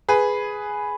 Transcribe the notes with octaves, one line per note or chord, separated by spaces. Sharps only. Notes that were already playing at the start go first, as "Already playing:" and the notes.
G#4 B4